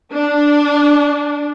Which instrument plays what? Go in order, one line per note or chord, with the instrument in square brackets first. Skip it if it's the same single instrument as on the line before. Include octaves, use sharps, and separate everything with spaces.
[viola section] D4